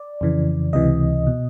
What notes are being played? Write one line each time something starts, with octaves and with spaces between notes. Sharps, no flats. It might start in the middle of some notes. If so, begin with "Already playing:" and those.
Already playing: D5
F2 C#3 E3
C#2 C3 E3 D#5
B2